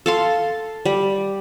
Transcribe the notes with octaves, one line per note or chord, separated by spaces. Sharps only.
A4 F5 C6
G3